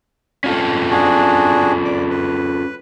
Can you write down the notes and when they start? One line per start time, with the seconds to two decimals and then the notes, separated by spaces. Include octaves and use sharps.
0.44 C#4 F4 A4
0.90 D4 F#4 G#4
1.85 D5
2.10 B4